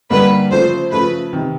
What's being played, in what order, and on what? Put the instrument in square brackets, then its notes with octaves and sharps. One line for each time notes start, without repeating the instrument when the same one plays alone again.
[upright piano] G2 D3 G3 A#3 [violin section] B4
[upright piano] C#3 F3 A3 [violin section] C5
[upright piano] C#3 F3 A3 [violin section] B4
[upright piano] C3 D#3